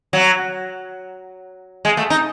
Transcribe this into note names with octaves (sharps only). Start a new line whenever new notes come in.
F#3
G#3
A3
D#4